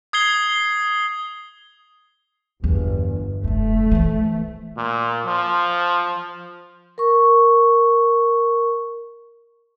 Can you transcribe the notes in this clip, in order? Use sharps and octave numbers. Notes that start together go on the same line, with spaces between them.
D#6 G#6 C7 G7
G1 E2
F1 F2 A3
E3 F3
A#2
F3
A#4 C#6